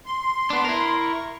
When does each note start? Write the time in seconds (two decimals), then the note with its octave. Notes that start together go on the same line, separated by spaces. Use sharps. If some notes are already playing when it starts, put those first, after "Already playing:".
0.06 C6
0.50 B3 D4
0.65 E4 A#4
1.00 C#6